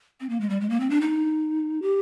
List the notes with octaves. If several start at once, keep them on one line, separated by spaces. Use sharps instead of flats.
C4
A#3
G#3
G3
G#3
A#3
C4
D4
D#4
G4